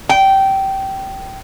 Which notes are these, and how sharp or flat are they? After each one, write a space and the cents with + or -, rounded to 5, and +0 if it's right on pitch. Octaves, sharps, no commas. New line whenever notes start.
G5 -20